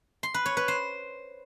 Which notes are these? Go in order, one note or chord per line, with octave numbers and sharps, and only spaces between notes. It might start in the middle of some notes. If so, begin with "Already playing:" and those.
C6
B4
C#5
B4
C5